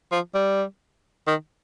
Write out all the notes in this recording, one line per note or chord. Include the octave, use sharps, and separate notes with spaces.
F3
G3
D#3